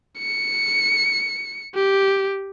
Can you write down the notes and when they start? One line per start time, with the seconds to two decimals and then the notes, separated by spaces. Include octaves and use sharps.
0.19 C#7
1.75 G4